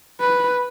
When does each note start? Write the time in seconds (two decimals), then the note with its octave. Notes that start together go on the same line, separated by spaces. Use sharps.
0.20 B4